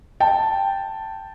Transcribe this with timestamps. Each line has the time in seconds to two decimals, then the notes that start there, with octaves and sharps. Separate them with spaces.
0.20 G5 A5